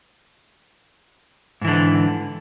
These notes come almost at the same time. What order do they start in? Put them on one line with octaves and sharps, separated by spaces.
G#2 E3 D3